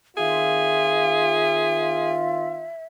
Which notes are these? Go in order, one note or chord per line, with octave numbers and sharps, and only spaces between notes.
D#3 C4 F4 G#4 E5